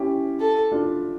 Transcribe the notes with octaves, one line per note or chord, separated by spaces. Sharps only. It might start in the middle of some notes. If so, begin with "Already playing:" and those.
Already playing: C#4 E4 G4
A4
D4 F4